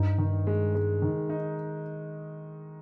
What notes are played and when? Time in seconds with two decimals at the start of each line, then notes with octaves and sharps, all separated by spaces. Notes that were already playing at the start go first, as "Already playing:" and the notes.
Already playing: G2 D#4
0.18 D#3
0.47 G#3
0.75 G#3
1.02 D#3
1.29 D#4